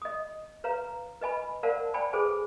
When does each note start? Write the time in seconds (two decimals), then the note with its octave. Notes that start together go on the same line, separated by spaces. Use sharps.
0.02 D#5 D#6
0.64 B4 C#5 F5 A#5
1.21 B4 D#5 G#5 B5
1.63 A#4 C5 D5 F5 F#5 A5
1.94 C5 D5 G5 G#5 B5
2.13 G#4 A4 B4 C5 G#5